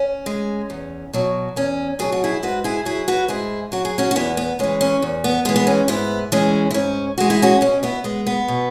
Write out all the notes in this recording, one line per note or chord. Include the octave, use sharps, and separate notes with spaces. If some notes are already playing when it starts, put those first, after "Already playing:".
Already playing: C#4
G#3
E2
B2 F#3
E2 C#4
B2 F#3 G#4
F#4
E4 G#4
G#2 F#4 B4
E4 G#4
F#3 E4 G#4
F#4 B4
G#2 E4 G#4
F#3 F#4
G#4
C#4 F#4
F#4
E2 B3 E4
B3
E3 G#3 C#4
C#4
E2
B3
E3 G#3 B3
B3
C#4
G#2 B3 E4
E3 G#3 C#4
E4
G#2 C#4
E3 G#3 F#4
E4
C#4 F#4
B2 C#4
B3 E4
G#3 B3
B3
B2